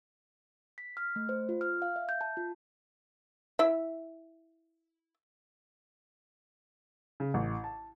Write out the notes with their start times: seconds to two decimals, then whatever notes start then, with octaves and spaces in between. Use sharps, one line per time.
0.78 B6
0.97 F6
1.16 A3
1.29 C5
1.49 F4
1.61 F6
1.82 F5
1.96 E5
2.09 G6
2.21 A5
2.37 F4
3.59 E4 E5
7.20 C#3
7.34 A1
7.64 A5